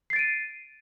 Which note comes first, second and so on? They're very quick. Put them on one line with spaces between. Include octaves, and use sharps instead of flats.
C7 A6 D7 D#7